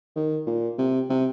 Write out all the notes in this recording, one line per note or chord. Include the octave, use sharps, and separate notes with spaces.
D#3
A#2
C3
C3